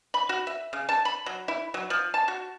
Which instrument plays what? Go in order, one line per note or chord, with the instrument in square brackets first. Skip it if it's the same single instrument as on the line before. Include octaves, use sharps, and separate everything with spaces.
[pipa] B5
F#4
E5
C#3
A5
B5
F#3
E4
F#3
F3
A5
F#4